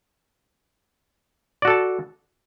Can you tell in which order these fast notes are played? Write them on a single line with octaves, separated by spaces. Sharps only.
D5 F#4 A4 A5